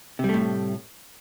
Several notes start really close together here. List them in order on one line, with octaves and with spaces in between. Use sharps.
C3 G3 A3 A2